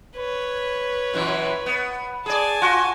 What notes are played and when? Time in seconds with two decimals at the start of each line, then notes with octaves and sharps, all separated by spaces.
0.17 B4 C#5
1.14 F#2 A#2 E3
1.66 B3
2.26 G#4 D5 G#5 A5
2.62 F4 F#4